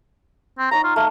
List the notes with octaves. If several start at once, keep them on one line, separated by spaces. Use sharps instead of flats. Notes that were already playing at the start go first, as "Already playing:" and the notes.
C4
D#4 C#5 F#5 A#5
F4
A3 F5